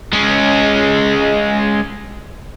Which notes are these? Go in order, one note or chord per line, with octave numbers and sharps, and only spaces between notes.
G#3 C#4